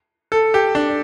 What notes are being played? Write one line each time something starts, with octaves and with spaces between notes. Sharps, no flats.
A4
G4
D4